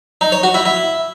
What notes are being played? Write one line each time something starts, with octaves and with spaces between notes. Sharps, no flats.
D#4
C#5
F#4
E4
E4